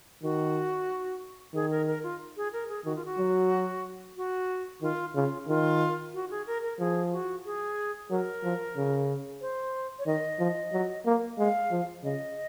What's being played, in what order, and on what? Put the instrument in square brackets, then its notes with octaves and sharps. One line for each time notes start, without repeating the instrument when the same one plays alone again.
[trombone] D#3 [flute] F#4
[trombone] D#3 [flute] G#4
[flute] A#4
A#4
F4
G#4
A#4
G#4
[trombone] D#3 [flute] F#4
[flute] F4
F#4
[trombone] F#3
[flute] F#4
[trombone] D#3 [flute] F4
[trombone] C#3 [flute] F4
[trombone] D#3 [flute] F4
[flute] F#4
G#4
A#4
A#4
[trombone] F3 [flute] G#4
[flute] F#4
G#4
[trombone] F#3 [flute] A#4
[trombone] F3
C#3
[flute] C5
C#5
[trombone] D#3 [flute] D#5
[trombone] F3
F#3
A#3
[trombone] G#3 [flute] F5
[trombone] F3
[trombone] C#3 [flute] D#5